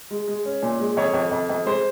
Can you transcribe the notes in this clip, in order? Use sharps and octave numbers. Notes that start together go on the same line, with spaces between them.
G#3
G#3
C#4
A#2
G#3
F2 C#5
F2
F2
F2
G#3 C5